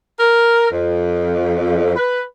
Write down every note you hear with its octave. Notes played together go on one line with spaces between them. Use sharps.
A#4
F2
B4